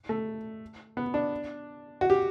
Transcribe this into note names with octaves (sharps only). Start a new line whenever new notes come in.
A3
B3
D4
F#4
G4